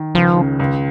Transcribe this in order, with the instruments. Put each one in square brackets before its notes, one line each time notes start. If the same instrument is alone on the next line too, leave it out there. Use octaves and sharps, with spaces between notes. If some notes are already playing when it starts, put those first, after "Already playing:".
Already playing: [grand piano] D#3
[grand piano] C#2 [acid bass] F3
[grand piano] C#3
C#2